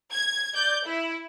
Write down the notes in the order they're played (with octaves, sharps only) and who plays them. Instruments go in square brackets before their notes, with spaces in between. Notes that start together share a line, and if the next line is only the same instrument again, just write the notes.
[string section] G#6
D5 G6
E4